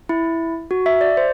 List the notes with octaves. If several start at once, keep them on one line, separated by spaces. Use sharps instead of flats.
E4
F#4
E5
D5
C5